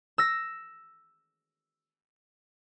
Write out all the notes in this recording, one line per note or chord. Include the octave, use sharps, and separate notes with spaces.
E6 A#6